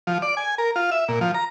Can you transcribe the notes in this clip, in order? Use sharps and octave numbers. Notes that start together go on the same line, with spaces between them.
F3
D5
G#5
A#4
F4
E5
A#2
F3
A#5